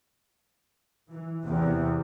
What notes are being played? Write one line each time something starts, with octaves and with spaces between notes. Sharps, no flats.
E3
E2 C3